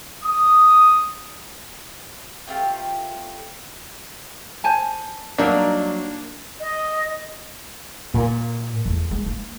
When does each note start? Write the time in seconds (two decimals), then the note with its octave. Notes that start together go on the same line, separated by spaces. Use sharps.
0.24 D#6
2.48 A3 C4 F4 G4
4.64 C5 G#5 A5
5.38 F#3 G3 A#3 D4 D#4
6.60 D#5
8.14 A#2
8.86 E2 A3
9.11 G#3
9.26 A#3